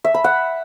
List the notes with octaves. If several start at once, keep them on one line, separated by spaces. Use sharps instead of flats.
E5
B5
F#5